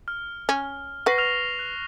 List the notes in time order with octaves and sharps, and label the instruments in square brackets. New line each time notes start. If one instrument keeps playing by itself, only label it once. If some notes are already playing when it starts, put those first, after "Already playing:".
[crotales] F6
[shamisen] C#4
[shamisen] B4 F#5 [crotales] C#6 A#6 C7
[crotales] F6 F7
F#6